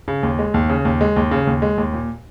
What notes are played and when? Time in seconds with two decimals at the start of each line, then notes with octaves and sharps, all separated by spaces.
0.08 C#3
0.23 D#2
0.39 G#3
0.54 D#2
0.70 C#3
0.85 D#2
1.01 G#3
1.16 D#2
1.31 C#3
1.47 D#2
1.62 G#3
1.78 D#2
1.93 A#2